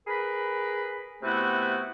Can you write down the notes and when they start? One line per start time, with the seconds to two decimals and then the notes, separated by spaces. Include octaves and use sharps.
0.07 G#4 A#4 B4 B5
1.23 C3 A3 B3 E4 F#4 B4